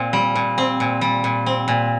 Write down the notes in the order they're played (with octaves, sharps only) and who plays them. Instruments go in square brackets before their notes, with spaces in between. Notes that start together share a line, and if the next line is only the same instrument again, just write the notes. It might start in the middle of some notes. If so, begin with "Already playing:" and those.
Already playing: [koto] A#2 C4
G3
A#2
C4
A#2
G3
A#2
C4
A#2